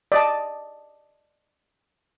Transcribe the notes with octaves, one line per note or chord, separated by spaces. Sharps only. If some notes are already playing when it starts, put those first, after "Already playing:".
D5 D#5 A5